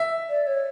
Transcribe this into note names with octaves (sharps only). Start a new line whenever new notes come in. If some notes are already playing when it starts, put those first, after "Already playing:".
Already playing: E5
D5
C#5